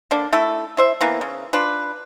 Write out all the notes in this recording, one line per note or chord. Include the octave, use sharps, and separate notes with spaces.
D3 A#3 D4
A3 E4 A4
E4 C5 E5
E3 A#3 B3
C#3
D4 F4 B4